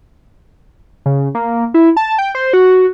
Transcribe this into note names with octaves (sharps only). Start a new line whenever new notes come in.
C#3
A#3
E4
A5
G5
C5
F#4